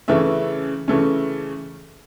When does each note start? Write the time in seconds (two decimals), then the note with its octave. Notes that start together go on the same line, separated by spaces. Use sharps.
0.08 C#3 E3 A3 C#4 E5
0.88 C#3 E3 A3 C#4